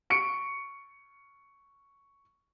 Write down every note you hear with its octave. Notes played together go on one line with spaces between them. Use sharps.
C#6 C#7 D7